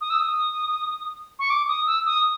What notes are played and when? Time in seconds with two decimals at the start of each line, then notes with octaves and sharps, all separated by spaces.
0.01 D#6
0.10 E6
0.19 D#6
1.39 C#6
1.50 D6
1.68 D#6
1.87 E6
2.06 D#6